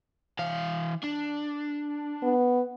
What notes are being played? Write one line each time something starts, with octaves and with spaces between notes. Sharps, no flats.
E3 F5
D4
B3